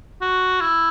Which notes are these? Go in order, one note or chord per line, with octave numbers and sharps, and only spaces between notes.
F#4
E4